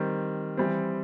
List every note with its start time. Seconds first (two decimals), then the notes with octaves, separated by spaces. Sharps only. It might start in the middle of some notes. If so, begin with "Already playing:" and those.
Already playing: D#3 G3 C4
0.57 E3 G3 C4